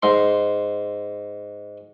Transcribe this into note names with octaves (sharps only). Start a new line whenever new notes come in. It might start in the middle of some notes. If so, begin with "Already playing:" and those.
G#2 C6